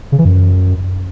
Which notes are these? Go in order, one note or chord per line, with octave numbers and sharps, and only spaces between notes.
C#3
E3
F#2